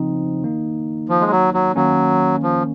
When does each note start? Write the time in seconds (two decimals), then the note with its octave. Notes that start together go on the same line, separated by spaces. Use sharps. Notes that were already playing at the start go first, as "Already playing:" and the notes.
Already playing: C#3 F3 C4 D#4
0.43 D#3 A#3 D#4
1.09 F3
1.21 G#3
1.31 F#3
1.54 F#3
1.76 D#3 F#3 A#3 C#4
2.43 F3